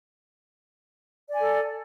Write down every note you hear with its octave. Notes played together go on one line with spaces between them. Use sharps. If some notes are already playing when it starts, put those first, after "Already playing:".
A4 D5 G#5